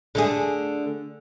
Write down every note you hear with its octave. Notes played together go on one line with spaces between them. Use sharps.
D3 A3 G#4